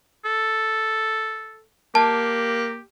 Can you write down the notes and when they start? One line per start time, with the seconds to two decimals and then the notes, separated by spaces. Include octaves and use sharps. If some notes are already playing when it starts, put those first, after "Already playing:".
0.25 A4
1.95 A#3 G4 A5